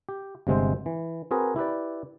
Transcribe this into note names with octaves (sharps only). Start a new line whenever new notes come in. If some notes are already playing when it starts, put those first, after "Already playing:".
G4
G1 C3 G#3 C4 C5
E3
C4 F#4 G#4 A#4 B4
E4 G4 B4 D5